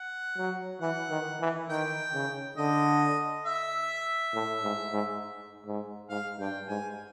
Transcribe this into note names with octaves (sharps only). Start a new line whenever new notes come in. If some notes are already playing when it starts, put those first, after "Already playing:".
Already playing: F#5
F#3
E3 F#5
D#3
E3
D#3 G5
C#3
D3 D#5
E5
A2
G#2
G#2
G#2
G#2 F5
G2 G5
G#2 G#5